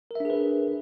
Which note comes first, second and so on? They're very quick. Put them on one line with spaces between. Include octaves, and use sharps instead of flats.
A#4 E5 D4 G#4 B4